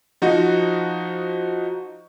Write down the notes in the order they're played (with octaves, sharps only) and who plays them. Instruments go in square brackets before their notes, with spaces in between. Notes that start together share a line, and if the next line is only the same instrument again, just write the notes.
[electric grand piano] F3 D#4 F#4